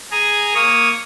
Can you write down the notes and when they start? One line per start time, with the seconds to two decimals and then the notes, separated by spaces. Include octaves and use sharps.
0.11 G#4 G#5 A#5
0.55 A#3 C#5 D#6